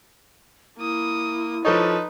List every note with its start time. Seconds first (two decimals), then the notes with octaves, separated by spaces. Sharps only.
0.78 A#3 E4 D#6
1.65 F3 D#4 A4 B4 C#5